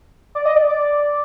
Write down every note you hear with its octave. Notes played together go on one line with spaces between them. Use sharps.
D5
D#5
D5
D5